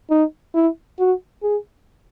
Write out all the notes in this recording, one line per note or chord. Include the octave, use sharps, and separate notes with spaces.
D#4
E4
F#4
G#4